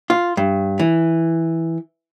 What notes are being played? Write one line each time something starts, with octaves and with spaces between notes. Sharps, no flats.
F4
G2
E3